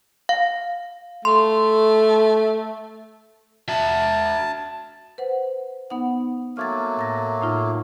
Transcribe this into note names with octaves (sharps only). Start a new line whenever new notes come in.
F5
A3 C6
F#4 E5 A5
B4 C5 F#5
B3 D#4 F#5
F#3 A3 A#3 F6 G#6 A6
A2 A6 A#6
A2 D#4 F4